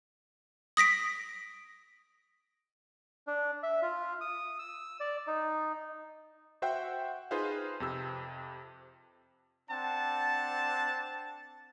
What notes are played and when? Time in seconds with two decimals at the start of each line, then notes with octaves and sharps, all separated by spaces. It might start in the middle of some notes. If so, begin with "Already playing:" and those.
0.77 D#6 A#6 B6 D7
3.27 D4
3.63 E5
3.82 F4
4.21 D#6
4.59 E6
5.00 D5
5.27 D#4
6.62 F#4 C5 E5 F#5 G5
7.31 D#4 F4 G#4 B4 C5 F5
7.80 F2 C3 E6
9.70 C4 D4 F#5 A5